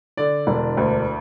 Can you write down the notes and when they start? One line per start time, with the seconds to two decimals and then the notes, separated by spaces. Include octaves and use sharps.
0.17 D3 D5
0.47 E1
0.77 D2